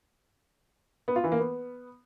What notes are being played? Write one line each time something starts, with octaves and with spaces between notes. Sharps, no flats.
B3
F4
E3
A#3
B3